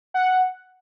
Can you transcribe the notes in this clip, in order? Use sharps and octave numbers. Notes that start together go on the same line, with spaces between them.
F#5